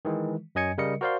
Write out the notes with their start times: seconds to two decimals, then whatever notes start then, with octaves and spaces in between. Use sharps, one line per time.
0.05 D#3 E3 G#3
0.55 F#2 F#3 D#5 G#5 G#6 C#7
0.78 C#3 G3 A#4 D#5 C#7
1.01 F#4 A#4 C5 D5 F5 C6